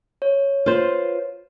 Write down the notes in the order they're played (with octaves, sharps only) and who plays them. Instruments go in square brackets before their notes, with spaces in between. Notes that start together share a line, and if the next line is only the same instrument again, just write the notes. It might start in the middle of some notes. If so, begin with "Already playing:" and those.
[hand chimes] C#5
[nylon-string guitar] F4 B4 C5